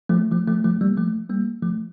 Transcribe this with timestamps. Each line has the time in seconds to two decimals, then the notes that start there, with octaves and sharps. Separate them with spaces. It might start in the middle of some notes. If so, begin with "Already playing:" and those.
0.09 F3 A3
0.32 F3 A3
0.48 F3 A3
0.64 F3 A3
0.81 G3 A#3
0.97 F3 A3
1.29 G3 A#3
1.62 F3 A3